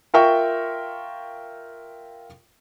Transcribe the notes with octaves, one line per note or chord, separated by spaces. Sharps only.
F4 A#4 E5 G5 C#6